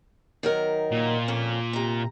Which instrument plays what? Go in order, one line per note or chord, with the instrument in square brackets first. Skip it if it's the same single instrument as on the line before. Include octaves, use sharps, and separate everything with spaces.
[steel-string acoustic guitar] D#3 F#3 A#4
[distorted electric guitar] A#2
[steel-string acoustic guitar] F2 C#4
C3 A#5